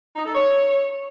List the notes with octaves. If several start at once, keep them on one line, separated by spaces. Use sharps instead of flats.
D#4
A4
C#5